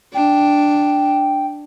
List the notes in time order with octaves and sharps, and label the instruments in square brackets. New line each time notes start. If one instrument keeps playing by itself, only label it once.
[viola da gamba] D4 [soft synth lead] G5